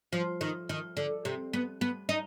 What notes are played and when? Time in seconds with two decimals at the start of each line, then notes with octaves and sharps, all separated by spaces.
0.13 F3
0.41 D#3
0.69 D#3
0.97 D3
1.25 C3
1.53 B3
1.81 B3
2.09 D#4